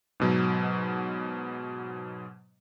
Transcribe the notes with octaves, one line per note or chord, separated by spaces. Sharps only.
G#2 B2 F#3